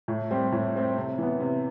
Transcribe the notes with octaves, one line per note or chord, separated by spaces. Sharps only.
A2
G3 C4 G4
A2
G3 C4 G4
C3
E3 B3
C3